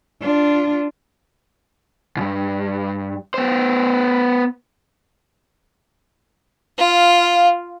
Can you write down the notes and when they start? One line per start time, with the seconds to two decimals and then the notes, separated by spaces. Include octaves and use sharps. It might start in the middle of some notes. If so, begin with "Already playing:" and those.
0.21 D4 F4
2.17 C2 G2
3.34 B3 C5
6.79 F4 F5